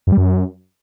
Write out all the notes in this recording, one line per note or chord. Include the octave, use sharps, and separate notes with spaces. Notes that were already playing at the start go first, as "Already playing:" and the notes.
F#2
G3
F#2